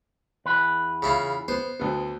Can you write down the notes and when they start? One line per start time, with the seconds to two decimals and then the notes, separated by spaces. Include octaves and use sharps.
0.46 E2 B4
1.02 C#3 E4 F4
1.48 B3 C5
1.80 D2 B3